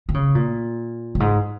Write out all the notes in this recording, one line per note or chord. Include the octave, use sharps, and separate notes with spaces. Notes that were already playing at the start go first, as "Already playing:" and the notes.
D#3
C#3
A#2
G2
G#2